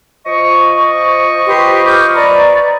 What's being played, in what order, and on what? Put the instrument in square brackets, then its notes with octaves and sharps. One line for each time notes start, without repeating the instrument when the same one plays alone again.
[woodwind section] F3 D#5 C#6
[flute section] G4 B4 C6
D6 F6 G6
B4 D5 A#5